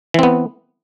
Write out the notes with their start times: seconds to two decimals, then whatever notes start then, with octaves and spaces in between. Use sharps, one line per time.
0.14 E3
0.19 C4
0.23 B3